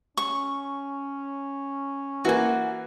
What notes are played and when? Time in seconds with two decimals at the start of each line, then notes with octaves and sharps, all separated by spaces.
0.17 C#4 C#6
2.25 E3 A#3 F#4 G#5